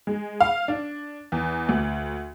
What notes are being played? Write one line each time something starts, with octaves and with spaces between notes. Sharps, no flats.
G#3
F5
D4
E2
D2